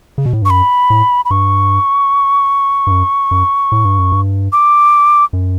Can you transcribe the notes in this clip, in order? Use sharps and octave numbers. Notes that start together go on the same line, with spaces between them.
C#3
B2
A2
G2
C#6
F#2 B5
A2
B5
G2 C#6
G2
F#2
F#2
A2
G2
F#2
G2
D6
F#2